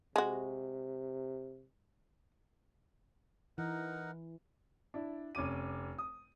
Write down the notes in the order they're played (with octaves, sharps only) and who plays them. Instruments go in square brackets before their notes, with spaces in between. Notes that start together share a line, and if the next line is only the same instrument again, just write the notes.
[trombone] C3 [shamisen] G#3 F#4
[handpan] E3 [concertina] D#4 A#4 F#5
[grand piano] D4 E4
F1 C#4 D6 D#7
D#6